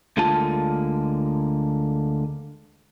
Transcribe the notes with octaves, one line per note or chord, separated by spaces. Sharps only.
D2 D3 G#3 A#3 F4 A5